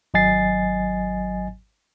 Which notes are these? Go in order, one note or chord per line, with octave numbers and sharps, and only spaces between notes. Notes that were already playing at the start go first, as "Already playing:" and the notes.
G#1 F#3 D#5 G#5 A6 C7